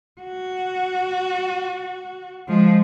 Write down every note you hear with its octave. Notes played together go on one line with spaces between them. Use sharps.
F#4
F3 G#3